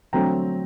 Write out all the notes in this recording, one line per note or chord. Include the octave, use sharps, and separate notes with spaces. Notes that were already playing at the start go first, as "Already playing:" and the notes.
D3 F#3 A3 C4 G5 A#5